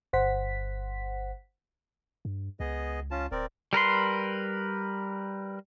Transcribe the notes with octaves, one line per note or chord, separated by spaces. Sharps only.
G1 C5 F#5 B6
G2
C#2 B3 G#4 D#5
C#4 F4 A5
D1 C4 A#4 D5
G3 A#4 B4 C6